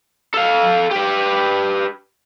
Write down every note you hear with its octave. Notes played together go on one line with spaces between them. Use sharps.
A4 F5
G4 B4